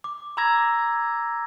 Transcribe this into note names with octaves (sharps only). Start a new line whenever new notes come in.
D6
A#5 B5 D6 E6 G#6 A#6